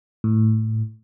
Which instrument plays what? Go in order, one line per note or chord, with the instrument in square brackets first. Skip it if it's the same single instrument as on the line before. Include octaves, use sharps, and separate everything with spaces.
[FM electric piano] A2